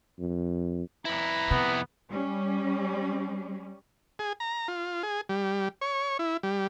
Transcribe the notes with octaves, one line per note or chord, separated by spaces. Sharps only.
F2
F2 E4 B4 A#5 B5
C3 B3
G3 C#4
G#4
A#5
F4
G#4
G3
C#5
E4
G3